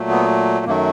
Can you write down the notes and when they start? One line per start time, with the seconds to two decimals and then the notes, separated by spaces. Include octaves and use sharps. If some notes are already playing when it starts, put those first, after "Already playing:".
Already playing: A#2 F#3 A3
0.10 B3
0.66 F#2 D#3 F#3 A3 A#3